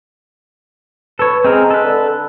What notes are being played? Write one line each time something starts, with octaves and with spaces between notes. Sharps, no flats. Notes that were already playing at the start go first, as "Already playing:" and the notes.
A4 B4 C#5
G#3 C4 G#4 A#4
A4 B4
D3